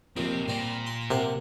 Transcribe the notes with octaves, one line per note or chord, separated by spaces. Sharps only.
A#1 D#2 C3 F3 C4
A#2 G3 C4
C6
C3 A#4 F#5 D6